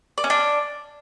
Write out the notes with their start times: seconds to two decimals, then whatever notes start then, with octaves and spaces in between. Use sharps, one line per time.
0.18 D5
0.24 C#4
0.30 D4